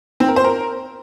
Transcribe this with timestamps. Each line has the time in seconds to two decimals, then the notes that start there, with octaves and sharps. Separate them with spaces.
0.20 C4
0.28 A#4
0.36 C5
0.44 A#4